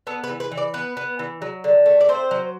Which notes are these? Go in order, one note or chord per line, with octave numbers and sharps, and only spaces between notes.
B3 A4
B4
E3
B4
E3
D5
B3 B4
B3
E3
F#3
D3
A3
D5
C4 C5
F#3